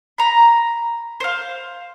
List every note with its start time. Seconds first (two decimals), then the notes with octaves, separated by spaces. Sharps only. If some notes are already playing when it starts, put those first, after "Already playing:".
0.18 A#5 B5
1.20 C5 F5